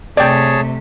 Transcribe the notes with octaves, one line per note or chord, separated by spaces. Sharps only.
C3 A3 G#4 C#5 D5 G5 A5